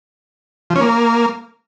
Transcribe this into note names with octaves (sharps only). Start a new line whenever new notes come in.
F3
C#4
A#3